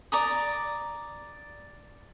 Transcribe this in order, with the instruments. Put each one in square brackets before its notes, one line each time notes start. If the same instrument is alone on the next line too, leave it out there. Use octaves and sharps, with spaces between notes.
[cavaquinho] D5 A#5 D#6